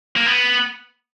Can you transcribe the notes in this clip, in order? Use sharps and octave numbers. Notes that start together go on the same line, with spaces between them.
A#3
B3